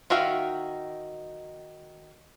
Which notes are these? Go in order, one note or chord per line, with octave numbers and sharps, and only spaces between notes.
D#3 F#4 E5 F5